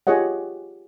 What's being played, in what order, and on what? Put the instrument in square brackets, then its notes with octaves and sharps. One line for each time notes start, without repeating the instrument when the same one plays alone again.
[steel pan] F4 G4 G#4 C#5 D#5 F#5